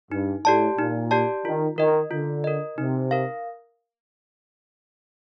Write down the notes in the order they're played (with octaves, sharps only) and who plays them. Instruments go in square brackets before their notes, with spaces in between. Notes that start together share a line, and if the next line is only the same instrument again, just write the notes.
[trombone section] G2 [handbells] D#4
[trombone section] A2 [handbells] G4 D5 A5
[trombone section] A#2 [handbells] D#4
[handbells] G4 D5 A5
[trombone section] D#3 [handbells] F4
[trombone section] D#3 [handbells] A#4 D#5
[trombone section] D3 [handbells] F4
[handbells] A#4 D#5
[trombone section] C3 [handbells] D#4
[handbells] A#4 F5